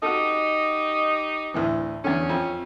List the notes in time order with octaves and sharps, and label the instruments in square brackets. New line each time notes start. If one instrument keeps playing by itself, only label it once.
[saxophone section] D#4 G4 D#5 [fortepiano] F#4 A4
[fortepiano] D2 A2 E3
[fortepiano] E2 D3 [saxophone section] C#4
[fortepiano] F2